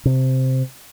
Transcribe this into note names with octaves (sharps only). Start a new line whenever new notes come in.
C3